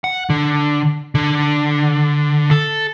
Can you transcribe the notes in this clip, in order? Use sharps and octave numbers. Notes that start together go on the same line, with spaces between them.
F#5
D3
D3
A4